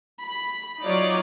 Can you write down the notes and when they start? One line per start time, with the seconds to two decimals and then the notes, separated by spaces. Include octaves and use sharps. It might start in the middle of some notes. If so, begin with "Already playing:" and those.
0.23 B5
0.84 F#3 D#4 F4 C#5 D5